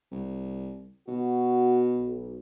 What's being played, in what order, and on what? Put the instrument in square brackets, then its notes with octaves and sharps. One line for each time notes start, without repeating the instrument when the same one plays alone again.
[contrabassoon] C2
[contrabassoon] B2 [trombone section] F#4
[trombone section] B1